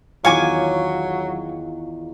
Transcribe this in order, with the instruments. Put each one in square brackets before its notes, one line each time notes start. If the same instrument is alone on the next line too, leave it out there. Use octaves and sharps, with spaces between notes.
[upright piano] E2 D#3 [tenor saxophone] F#3 [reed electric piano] F4 F5 [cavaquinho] C#5 G#5 D6